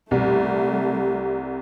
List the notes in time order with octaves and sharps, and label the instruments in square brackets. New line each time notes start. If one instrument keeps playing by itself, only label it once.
[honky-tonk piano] C2 C3 [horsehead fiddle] G3 A3